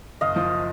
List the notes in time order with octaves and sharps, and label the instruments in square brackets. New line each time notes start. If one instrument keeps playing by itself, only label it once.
[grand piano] F#1 [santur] D#5 F5
[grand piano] F3